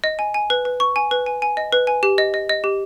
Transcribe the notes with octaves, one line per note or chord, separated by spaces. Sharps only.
D#5
G#5
G#5
B4
B4
C#6
G#5
B4
G#5
G#5
D#5
B4
G#5
G4
D#5
D#5
D#5
G4